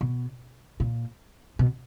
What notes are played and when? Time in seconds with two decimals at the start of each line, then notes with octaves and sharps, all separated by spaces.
0.01 B2
0.80 A#2
1.59 B2